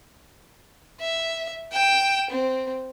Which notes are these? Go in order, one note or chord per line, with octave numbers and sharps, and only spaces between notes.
E5
G5 E7
C4